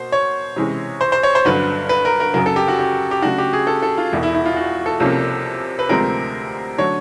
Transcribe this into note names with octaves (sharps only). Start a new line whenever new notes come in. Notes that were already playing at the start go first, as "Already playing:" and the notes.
Already playing: B2 A#3 C5
C#5
C3 E3 G#3 C#4
C5
C5
C#5
C5
G1 G2 D3 F#3 B4
B4
A#4
A#4
F#2 C#3 F#3 A#4
A4
G4
F#4
G4
G4
C#3 F#3 A3 D4 F#4
G4
G#4
A4
A4
F4
E1 E2 B2 E4
E4
E4
F4
F#4
A4
C2 C3 F3 A#3 C#4
B4
D2 C3 F3 G#3 C4 A#4
D3 F#3 A3 D4 C#5